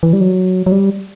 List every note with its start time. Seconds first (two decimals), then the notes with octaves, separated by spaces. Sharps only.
0.03 E3
0.13 G3
0.21 F#3
0.66 F#3
0.72 G3